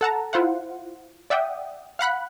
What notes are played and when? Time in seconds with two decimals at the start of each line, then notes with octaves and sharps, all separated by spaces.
0.01 A4 F#5 A5 A#5
0.33 E4 F4 C5 F5 F#5
1.30 D5 E5 F#5 G5 D#6
1.99 F5 F#5 B5 F#6